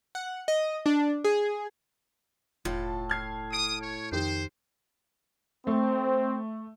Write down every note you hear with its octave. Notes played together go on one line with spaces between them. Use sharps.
F#5
D#5
D4
G#4
E1 A2 F4 A4
F6 G#6 C7
D#6 D7
C#5
F2 D#3 G4 C5
A3 C4